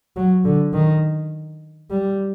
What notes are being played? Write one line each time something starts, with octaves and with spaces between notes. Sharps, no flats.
F#3
D3
D#3
G3